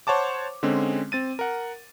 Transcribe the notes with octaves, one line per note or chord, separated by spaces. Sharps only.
C5 C#5 F#5 A5 D6
D3 G#3 C4 C#4
C4 A6 D#7
A#4 F#5